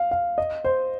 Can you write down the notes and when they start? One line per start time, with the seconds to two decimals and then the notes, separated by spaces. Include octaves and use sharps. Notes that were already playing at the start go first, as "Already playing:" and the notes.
Already playing: F5
0.11 F5
0.38 D#5
0.65 C5